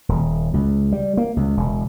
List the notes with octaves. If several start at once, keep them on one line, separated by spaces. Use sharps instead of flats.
D#1
C#2
G3
A#3
C#2
E1